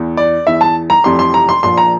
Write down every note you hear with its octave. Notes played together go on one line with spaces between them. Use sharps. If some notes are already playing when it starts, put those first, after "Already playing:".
Already playing: E2 E3
D5
E2 E3 E5
A5
A#5
F1 F2 C3 E3 C6
C6
A#5
C6
A#1 A#2 F3 C6
A#5